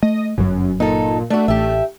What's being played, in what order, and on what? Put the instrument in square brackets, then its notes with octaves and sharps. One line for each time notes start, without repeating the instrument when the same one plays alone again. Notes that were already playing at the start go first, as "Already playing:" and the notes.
[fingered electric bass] A3 [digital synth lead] D#5
[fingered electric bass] G1 F#3 [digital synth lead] F#2
[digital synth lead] A#2 [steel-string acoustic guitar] D#4 A4
[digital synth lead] A3 [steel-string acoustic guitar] D4 F#4
[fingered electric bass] A1 [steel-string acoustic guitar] G4 E5